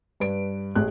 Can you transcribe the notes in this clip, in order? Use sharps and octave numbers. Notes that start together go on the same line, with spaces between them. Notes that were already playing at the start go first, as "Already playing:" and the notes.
G2 B4 D7
A1 A3 G#4 F#6